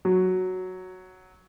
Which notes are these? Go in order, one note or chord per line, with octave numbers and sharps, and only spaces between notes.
F#3